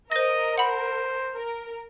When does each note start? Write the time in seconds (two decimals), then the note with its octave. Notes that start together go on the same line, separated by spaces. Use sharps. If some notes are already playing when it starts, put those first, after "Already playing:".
0.12 A#4 C5 D#5 A#6
0.58 C5 F#5 B5
1.35 A#4